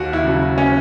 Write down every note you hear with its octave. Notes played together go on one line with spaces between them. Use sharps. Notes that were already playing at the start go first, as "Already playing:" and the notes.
Already playing: D#2 F#4
E4
C#3 F#3
C#4